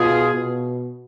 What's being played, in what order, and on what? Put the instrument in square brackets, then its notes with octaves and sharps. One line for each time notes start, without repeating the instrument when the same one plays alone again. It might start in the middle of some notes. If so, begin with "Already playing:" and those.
Already playing: [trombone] B2 [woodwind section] F4 G#4
[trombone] B2